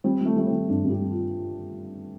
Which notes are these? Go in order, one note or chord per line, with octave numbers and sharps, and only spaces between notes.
G3 C4
G3 A3
G3 A3
C4
G3
G2 D4
G2
G4
G3
F4